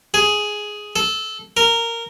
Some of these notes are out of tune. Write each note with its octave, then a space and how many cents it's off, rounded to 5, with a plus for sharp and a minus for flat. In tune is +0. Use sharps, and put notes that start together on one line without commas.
G#4 +5
A4 -15
A#4 -15